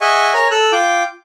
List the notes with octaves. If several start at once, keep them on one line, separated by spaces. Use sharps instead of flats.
G#4 D#5 E5 F#5 G#5 C#6
A#4 C#5 G#5 A#5
A4 E6 F#6
F4 G5 D6